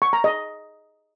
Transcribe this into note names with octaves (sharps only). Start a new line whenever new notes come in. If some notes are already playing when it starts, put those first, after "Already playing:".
C#6
A#5
D#5